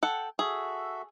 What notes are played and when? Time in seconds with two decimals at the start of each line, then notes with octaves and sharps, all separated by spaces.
0.03 A4 F#5 G5
0.39 F#4 G#4 A4 E5